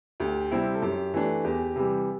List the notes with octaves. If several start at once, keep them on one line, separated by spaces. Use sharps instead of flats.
D2 G4
C3 G3 C4 E4
A4
F#2 G4
E3 A3 D4
E2 G4
C3 E3 G3